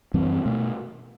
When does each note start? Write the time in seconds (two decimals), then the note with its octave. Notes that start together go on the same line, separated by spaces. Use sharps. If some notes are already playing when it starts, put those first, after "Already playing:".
0.14 F#2 E3 G3 C4
0.45 B2 A3